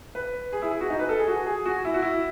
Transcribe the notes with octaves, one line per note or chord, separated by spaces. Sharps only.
B4
G#4
E4
G#4
F#4
D#4
B4
A4
G#4
F#4
G#4
F#4
E4
F#4
E4